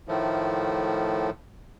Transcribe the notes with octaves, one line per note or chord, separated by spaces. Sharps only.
A2 D#3 F3 A3